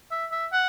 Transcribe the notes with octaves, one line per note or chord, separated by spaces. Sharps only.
E5
E5
F#5